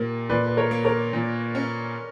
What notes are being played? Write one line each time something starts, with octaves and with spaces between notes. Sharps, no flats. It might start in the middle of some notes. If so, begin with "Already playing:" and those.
Already playing: A#2 A#3 G4
A#2 B4 D5
B4
A#4 C#5
A#3
A#4 C#5
A#2
C#4